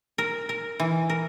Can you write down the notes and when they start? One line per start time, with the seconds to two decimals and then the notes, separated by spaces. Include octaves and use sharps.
0.18 A#4
0.49 A#4
0.80 E3
1.10 A#4